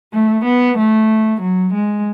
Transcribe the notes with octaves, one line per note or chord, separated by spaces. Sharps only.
A3
B3
A3
F#3
G#3